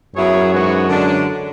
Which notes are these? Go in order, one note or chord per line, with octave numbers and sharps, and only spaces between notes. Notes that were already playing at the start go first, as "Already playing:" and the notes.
F#2 F#3 B3 E4 G#4 C#5
G#2 E3 B3 F#4 C#5
D3 G#3 D4